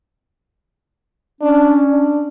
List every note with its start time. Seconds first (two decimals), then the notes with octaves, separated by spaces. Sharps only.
1.42 C#4 D4
1.90 D4